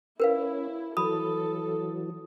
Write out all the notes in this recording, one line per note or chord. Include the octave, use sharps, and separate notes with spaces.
C#4 E4 A#4 B4 F5
E3 F#3 A4 B5 D#6